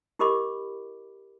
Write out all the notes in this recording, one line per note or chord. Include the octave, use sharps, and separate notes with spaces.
E4 G4 A#4 D#5 B5 D6